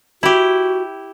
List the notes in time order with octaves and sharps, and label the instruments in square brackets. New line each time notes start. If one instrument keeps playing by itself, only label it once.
[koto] E4 G4 [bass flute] F#4